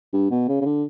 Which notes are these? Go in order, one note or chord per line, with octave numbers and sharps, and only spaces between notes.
G2
B2
C#3
C#3
D3